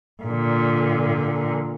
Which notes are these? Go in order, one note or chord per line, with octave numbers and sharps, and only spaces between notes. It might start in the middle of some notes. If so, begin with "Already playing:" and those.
A#2 D3